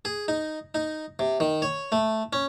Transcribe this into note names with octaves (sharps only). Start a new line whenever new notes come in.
G#4
D#4
D#4
C3
D#3
C#5
A3
C#4